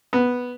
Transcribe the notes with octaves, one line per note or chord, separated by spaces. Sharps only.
B3